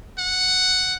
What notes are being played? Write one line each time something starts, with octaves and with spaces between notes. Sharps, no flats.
F#5